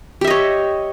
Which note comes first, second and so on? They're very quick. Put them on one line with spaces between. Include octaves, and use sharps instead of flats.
G4 E5 D#5 C#5